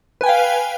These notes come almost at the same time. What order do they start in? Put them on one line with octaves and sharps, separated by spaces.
B4 G#5 G5 F5